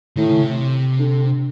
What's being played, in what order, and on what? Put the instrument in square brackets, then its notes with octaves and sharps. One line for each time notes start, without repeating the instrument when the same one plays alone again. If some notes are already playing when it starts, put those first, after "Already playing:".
[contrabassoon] A2 [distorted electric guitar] D#3
[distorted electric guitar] C#3
C3
[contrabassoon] D3